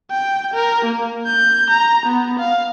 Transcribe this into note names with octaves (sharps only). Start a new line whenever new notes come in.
G5
A#4
A#3
G6
A#5
B3
F5